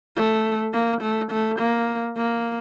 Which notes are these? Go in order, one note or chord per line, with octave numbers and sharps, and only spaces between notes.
A3
A#3
A3
A3
A#3
A#3